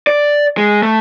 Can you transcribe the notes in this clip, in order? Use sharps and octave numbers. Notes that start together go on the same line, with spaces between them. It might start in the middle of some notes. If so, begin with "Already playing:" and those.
D5
G#3
A3